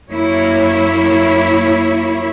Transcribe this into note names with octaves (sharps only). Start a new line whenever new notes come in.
F#2 A#3 E4 C#5